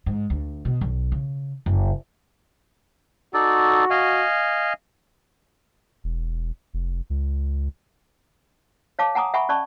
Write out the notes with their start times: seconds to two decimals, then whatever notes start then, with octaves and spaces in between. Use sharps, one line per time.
0.06 G#2
0.30 D2
0.65 B2
0.81 B1
1.12 C#3
1.66 F#1
3.34 D#4 F#4 A4 D5
3.90 D#5 F5 G#5
6.04 E1
6.74 F1
7.10 C#2
8.99 C#5 F5 A5 D6
9.15 F#5 G#5 A#5 D6 D#6
9.34 E5 F#5 G#5 B5 C#6
9.49 C#4 D5 A5 C#6